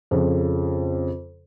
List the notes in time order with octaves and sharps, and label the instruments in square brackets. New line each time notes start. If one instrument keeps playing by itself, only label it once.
[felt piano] F2 C#3